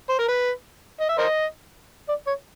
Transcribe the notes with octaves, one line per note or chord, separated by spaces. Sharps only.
C5
A#4
B4
D#5
E5
A#4 C5 D#5
D5
C#5